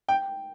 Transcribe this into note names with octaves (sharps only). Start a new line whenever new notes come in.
G5